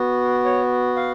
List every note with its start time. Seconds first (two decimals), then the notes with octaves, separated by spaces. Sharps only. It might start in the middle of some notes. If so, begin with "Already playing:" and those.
Already playing: B3 F#4
0.45 C#5
0.96 F5